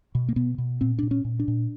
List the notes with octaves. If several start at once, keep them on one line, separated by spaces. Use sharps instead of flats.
B2
A#3
B2 B3
B2
A#2 C4
A#2 D4
C#4
A#2
D4
A#2